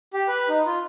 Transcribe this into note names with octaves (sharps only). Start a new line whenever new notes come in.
G4
B4
D#4
F4